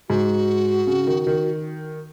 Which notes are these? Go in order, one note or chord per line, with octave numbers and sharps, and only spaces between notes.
G#2 F#4
C#3
D#3
D#3